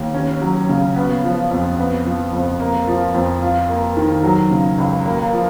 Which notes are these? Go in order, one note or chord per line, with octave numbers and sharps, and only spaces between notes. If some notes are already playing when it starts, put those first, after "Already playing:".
Already playing: D#2
C#4
F#3
C#3
B3
F3
F2
B3
F3
F2
A#3
F3
F2
F4
A#3
D#3
F#3
C#3
C#2
A#3
F3